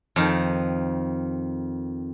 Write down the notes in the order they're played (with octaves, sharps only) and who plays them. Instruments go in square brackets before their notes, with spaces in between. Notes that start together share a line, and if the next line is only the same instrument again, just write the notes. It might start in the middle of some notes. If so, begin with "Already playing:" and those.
[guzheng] F2 D#3